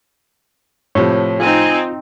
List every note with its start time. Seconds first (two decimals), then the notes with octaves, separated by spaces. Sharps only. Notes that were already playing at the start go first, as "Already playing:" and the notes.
0.95 A2 C3 F3 C#5
1.40 C4 D#4 F4 G#5